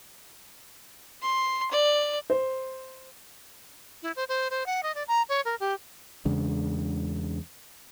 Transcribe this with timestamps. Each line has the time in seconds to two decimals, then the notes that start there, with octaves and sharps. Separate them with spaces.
1.22 C6
1.71 D5
2.30 C5
4.03 E4
4.16 C5
4.29 C5
4.51 C5
4.66 F#5
4.83 D#5
4.95 D5
5.08 A#5
5.29 C#5
5.45 A#4
5.60 G4
6.25 E2 C#3 G#3 D4